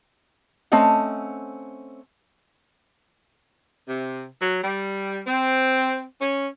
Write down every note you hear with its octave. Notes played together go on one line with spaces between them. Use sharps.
A3 C4 C#4 D#5 F#5
C3
F#3
G3
C4
C#4